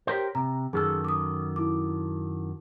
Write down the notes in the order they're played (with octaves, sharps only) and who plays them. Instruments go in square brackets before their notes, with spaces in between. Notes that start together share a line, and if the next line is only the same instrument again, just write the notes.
[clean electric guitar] G4 A#4 C5 [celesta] C#5
[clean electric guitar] C3 [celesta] A#5
[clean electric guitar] F#2 D#3 A4 [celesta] G#4 E6
[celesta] D6 D#6
E4 D6